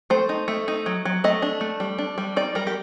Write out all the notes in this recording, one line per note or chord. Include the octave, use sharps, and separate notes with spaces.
A3 C5
D#4
A3
D#4
F#3
F#3
A3 D#5
D4
A3
G3
D4
G3
D#4 D5
G3 A#4
G4